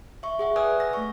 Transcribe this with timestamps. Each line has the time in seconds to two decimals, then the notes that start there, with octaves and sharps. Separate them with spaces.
0.23 E5 C#6
0.39 G#4 E5 F#5
0.56 B4 D5 G#5 D#6 E6 F#6
0.80 A#6
0.93 A3 C#6